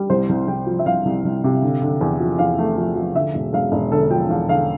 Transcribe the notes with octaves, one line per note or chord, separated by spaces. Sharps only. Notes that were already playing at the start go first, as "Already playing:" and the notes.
Already playing: G3
C2 C5
C2
C2 G5
F3
E5
C2 F5
C2
C2
C3
D3
D3
E2
F3
E2 F5
A3
F3
F3
D3 E5
E1
E1 F5
E1
D3 A4
F3 G5
E2 F5
D3 F5